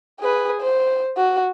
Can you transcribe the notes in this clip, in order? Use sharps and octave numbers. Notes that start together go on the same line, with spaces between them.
G#4 B4
C5
F#4